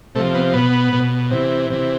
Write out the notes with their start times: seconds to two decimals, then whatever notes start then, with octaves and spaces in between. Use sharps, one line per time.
0.15 C3 A3
0.19 F3
0.34 B3
0.53 B2 B3
0.93 B2
1.31 C3 E3
1.70 C3 E3